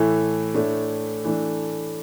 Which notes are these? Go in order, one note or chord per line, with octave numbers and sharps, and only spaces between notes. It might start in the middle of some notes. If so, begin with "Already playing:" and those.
Already playing: A2 E3 A3
A2 A3 D4
E3 A3 D4